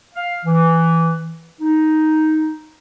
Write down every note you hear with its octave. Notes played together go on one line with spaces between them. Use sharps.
F5
E3
D#4